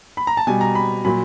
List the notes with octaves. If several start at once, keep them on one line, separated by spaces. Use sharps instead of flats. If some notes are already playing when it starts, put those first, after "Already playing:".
B5
A#5
A5
B2 G3 G#5
A#5
B5
A#2 F#3 B5